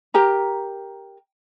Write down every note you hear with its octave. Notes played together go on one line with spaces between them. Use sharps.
G4 A#4 A#5